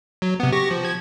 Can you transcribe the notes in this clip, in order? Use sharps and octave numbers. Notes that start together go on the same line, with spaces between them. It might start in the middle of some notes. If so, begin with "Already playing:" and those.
F#3
C3 B3
G4 C#6 A#6
F3
F3 G#6